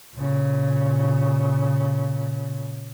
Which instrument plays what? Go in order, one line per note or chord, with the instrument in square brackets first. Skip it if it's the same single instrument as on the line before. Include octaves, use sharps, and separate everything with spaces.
[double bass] A#2 C#3